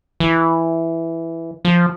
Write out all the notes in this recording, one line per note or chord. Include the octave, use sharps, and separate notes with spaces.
E3
F3